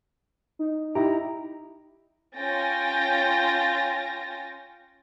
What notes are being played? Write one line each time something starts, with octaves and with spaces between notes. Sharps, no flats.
D#4
D#4 E4 G4 A#5
C#4 F4 G5 G#5 A6 A#6